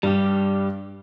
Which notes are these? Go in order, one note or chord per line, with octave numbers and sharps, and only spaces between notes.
G2 G3 G4